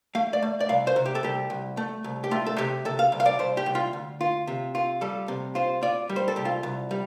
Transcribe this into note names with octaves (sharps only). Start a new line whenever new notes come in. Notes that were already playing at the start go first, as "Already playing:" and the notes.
A3 F5
D5
A3
D5
C2 F5
C5
C3
G4
A4
C2 G4
C2
A3
C2
G4
A3 F4
A4
C3 G4
C3 A4
F5
C2
F5
D5
C2 C5
G4
C2
F4
D2
F4
C3
F4
G3 A4
C3
F4 C5
F4 D5
G3
C5
A4
C2 G4
F4
C2
G3